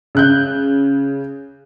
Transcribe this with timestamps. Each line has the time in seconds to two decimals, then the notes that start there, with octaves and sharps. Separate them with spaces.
0.15 C#3 F#6 G6